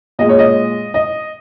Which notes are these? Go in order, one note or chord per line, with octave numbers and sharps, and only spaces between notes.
A#2 G#3 D#5
C#5
D#5
D#5